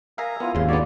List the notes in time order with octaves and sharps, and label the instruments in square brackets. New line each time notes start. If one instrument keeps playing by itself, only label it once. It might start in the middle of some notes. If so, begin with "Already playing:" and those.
[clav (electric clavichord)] A#4 E5 F5 [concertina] G#5 A#5 D#6
[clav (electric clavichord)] B3 [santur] E4 F4 F5
[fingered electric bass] D#2 G#2 [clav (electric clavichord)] C#3 [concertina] C6
[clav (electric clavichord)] D3 B3 [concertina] C#5 D5